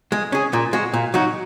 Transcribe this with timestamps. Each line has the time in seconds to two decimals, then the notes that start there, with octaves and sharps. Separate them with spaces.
0.12 G#3
0.32 C#4 G#4
0.53 A#2
0.73 G#3 F#4
0.93 A#2
1.14 F#3 D#4 F#4